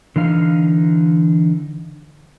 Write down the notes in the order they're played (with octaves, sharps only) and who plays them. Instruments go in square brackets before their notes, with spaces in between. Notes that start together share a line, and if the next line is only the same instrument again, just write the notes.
[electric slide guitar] D3 E3 D#4 F5